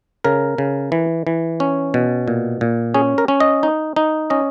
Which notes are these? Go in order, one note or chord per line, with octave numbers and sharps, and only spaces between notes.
C#3 A#4
C#3
E3
E3
C#4
B2
A#2
A#2
C#4 G#4
A#4
C#4
D#5
D#4
D#4
C#4 D#5